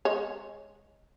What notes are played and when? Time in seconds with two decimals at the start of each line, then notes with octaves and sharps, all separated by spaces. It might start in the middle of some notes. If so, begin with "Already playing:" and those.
0.05 G#3 C#5